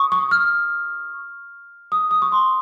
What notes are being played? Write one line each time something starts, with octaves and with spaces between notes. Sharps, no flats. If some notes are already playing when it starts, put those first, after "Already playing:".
Already playing: C#6 D#6
C#6
F6
D#6
D#6
C#6
C6